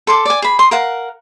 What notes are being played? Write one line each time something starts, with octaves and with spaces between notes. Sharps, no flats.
A4 C6 D6
D5 G#5
G#4 B5
C6 D#6
A#4 F5 F#5